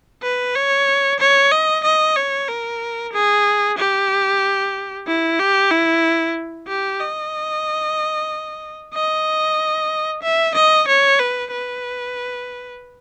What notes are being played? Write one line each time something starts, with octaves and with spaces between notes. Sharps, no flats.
B4
C#5
C#5
D#5
D#5
C#5
A#4
G#4
G4
E4
G4
E4
G4
D#5
D#5
E5
D#5
C#5
B4
B4